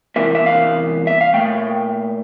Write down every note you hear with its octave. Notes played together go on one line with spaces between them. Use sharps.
E2 C3 E3 A#3 E5
E5
F5
E5
F5
A#2 F3 A3 G5